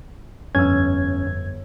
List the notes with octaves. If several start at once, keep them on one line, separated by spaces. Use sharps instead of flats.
G1 F2 C#4 E6 G#6